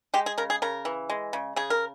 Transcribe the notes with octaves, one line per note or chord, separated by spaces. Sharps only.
G#3 G4
G#4
C#3 A#4
G#4
C#3 A#4
E3
G#3
C#3
C#3 G#4
A#4